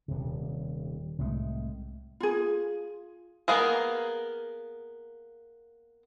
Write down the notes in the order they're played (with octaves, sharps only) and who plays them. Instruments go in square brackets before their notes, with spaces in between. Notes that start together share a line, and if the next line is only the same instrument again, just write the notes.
[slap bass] D#1 C3
C2 A2 G#3 A3
[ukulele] F4 G#4
[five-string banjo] A#3 B3 G#4 A#4